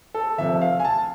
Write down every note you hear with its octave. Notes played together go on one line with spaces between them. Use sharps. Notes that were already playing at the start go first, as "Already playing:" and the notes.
A4
F1 F2 C3 E5
F5
G#5
A5